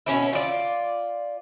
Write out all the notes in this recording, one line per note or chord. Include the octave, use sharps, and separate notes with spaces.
B2 C#4 E4
F4 D5